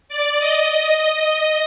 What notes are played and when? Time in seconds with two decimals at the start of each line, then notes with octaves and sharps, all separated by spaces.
0.09 D5
0.39 D#5